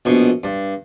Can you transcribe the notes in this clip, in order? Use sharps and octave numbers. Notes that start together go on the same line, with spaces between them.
A#1 B2
G2